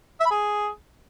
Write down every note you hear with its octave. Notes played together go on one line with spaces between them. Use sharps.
E5
B5
G#4